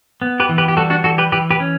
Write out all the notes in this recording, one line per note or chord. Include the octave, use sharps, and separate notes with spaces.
B3
G4 B4
E3
G4 B4
G4
G3 F#4 A4
D4 F#4
E3 F#4 A4
G4 B4
E3 G4 B4
G4 B4
C#4